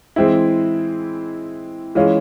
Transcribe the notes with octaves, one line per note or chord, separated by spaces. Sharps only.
E3 G#3 C4 E4
E3 G#3 C#4 F4